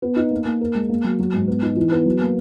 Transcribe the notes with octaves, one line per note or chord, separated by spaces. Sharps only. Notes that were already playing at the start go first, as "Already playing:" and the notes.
B3
D#4
A#3
A#3
A#4
G#3
A#3
F#3
F#3
G#2
B3
D#4
E3
B3
F#3
A#3